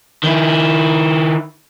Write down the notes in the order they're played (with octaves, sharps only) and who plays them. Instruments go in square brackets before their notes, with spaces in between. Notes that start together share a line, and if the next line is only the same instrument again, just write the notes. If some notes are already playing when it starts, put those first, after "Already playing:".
[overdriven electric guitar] D#3 E4